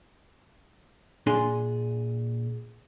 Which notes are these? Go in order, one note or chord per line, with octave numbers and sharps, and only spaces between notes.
A#2 D4 G#4 C6